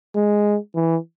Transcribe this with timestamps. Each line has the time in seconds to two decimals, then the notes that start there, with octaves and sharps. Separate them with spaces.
0.15 G#3
0.75 E3